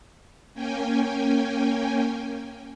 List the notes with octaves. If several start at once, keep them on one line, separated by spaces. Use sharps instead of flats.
A#3 C#4 G5 G#5